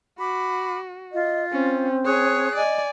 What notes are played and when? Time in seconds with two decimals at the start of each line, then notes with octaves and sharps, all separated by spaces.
0.19 F#4 B5 D6
1.12 F4 D#5
1.52 C4 C#4
2.05 G#4 C#5 D#6 F#6
2.56 D5 D#5 G#5